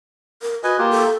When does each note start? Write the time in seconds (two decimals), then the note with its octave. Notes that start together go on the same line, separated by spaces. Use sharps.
0.42 A#4
0.64 F#4 B4 D#5 G#5
0.78 A#3 F4 G4
0.91 A4